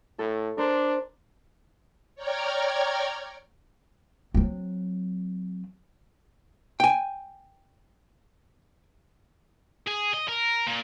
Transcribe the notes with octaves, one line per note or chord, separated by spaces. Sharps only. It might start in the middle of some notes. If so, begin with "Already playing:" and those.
A2 A4
D4 A#4 C5
C#5 D5 G5 A#5 F6 G#6
F#3 C4
G5 G#5
G#4
D#5
A#4
A#2